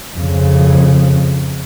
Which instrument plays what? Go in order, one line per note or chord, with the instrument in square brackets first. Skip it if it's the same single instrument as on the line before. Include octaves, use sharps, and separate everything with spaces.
[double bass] F2 C#3